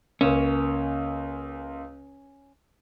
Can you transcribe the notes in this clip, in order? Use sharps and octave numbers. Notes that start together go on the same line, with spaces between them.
C#2 A#3 C#4 E7